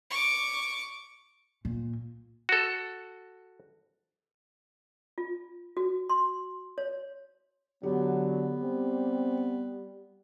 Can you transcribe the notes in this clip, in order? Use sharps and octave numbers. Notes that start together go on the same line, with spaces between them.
C#6 D6
A#2
F#4 A4
F4
F#4
C6
C#5
D3 F#3 B3 G4
G3 C4